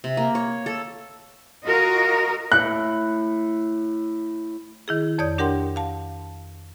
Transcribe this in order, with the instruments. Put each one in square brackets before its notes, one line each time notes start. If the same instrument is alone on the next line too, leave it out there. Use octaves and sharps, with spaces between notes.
[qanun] C3
A#3
C#5
A4
[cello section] F4 F#4 A#4 D#5
[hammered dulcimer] A2 [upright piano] F#6
[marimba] D#3 E4 G#4
F2 C#5 D5 D#6 G6
D4 G4 A#4 F#5 G5 C6
F5 A5